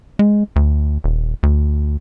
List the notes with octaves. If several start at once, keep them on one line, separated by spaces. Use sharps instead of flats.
G#3
D2
D#1
D2